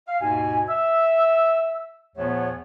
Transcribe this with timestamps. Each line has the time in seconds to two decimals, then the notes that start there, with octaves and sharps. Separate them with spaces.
0.07 F5
0.21 D#2 G#2 B2 G#5
0.68 E5 E6
2.16 E2 A#2 F3 A3 B3 C#5